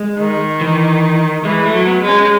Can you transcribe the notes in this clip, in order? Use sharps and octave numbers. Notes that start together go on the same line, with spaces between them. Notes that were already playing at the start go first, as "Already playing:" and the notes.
Already playing: G#3
D#3
E3
E3 G#3
A3
F#3
B3
G#3
C#4